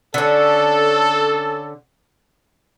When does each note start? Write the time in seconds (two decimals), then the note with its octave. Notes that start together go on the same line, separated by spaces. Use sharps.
0.14 D3 C#4 A4